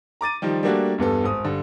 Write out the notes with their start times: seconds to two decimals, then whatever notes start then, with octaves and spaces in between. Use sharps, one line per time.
0.21 A#5 D6 A6 D#7
0.42 D#3 F3 G3
0.63 G3 A3 A#3 D4 F#4
0.98 E2 G2 B3 A4
1.24 G#1 D#6
1.44 G2 D3